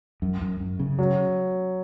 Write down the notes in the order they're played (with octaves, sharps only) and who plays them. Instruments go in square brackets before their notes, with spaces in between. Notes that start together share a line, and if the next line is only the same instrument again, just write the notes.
[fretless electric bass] F#2
F#2
F#2
C#3
[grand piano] F#3